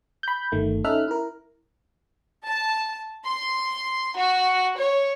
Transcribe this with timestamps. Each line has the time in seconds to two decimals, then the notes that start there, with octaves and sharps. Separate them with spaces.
0.23 B5 G6
0.52 G1 D#3 A3
0.84 C#4 D#4 A4 E5 F6 F#6
1.08 E4 A#4
2.46 A5
3.25 C6
4.18 F#4
4.77 C#5